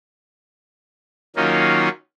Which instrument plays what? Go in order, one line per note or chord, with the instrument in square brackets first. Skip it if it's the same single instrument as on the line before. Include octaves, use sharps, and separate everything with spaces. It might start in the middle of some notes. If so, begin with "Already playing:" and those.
[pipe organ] D#3 F#3 A#3 C#4 D#4 F4